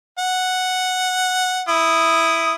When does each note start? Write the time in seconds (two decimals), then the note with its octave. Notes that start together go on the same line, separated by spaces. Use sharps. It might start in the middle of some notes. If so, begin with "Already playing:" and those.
0.18 F#5
1.68 E4 D#6